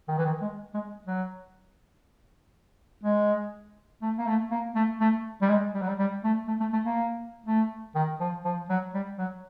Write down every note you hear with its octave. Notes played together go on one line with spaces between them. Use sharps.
D#3
E3
D#3
G#3
G#3
F#3
G#3
A3
A#3
A3
A#3
A3
A3
G3
G#3
G3
F#3
G3
G3
A3
A3
A3
A3
A#3
A3
D#3
F3
F3
F#3
G3
F#3